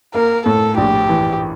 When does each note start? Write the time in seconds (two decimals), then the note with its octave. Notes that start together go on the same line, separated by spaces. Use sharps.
0.14 A#3 A#4
0.46 A2 A4
0.77 A#1 G4
1.09 E3